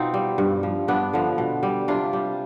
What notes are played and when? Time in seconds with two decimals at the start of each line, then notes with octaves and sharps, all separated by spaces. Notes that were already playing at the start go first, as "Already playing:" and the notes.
Already playing: B2 C4 D#4 F4
0.14 G3
0.38 G2
0.63 F3
0.88 G2 B3 D4
1.13 D3 F3
1.38 B2
1.63 G3
1.88 C3 D4 F4
2.13 G3